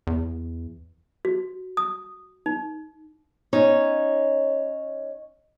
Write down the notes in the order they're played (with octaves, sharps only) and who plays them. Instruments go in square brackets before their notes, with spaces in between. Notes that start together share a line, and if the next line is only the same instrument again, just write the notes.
[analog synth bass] E2
[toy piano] F#4
D#6
D#4
[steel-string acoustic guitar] C#4 D#4 C#5